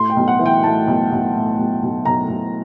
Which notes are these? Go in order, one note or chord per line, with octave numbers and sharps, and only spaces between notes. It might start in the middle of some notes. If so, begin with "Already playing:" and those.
Already playing: A2 C6
G5
B1
F#5
E3
G5
A2 A5
B1
B1
A2
B1
B1
B1 A#5
B1